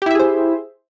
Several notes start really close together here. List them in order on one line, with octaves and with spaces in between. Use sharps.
G4 E4 E5 G#4 C5